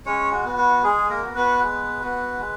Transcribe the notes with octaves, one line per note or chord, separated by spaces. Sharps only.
G#3 C#4 C#5
F#4
B3 F#4
F#4
G#3 G#4
A#3 A#4
B3 F#4
B3 B4
G#3
B3 F#4
G#3